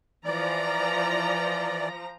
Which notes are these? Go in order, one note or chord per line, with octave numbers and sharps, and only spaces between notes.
E3 F3 D5 A#5